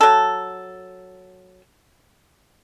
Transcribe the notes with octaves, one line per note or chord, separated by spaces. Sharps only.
F#3 A4